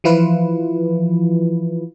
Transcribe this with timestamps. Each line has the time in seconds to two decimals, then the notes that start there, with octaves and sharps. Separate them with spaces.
0.04 E3 F3 E4 F4 B4